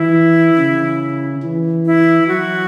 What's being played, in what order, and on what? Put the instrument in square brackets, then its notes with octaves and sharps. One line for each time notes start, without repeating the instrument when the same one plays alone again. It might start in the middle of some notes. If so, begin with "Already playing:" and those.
Already playing: [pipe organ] E3 [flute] E4
[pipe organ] C#3
E3
[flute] E4
[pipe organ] F#3 [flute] F#4